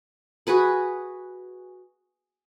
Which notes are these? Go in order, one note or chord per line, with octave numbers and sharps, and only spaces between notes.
F#4 G#4 B4 B5